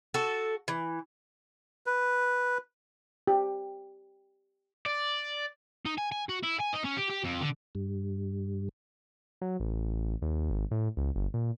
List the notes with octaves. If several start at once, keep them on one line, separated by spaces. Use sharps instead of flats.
F#4 A4
E3
B4
G4
D5
D#4
G#5
G#5
F#4
E4
G#5
D#4
C#4
G4
G4
F2
D3
G2
F#3
A1
D#2
G#1
A2
C#2
G1
A#2